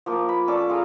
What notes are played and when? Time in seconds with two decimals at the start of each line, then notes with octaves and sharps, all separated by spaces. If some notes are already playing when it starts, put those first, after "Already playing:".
0.06 F3 A#3
0.29 B5
0.47 C#4 A4 D5 D6
0.69 F4 G#4 F5 A#5